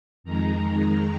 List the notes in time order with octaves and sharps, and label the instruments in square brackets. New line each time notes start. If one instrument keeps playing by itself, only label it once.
[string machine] F2 D#3 G#3 A#5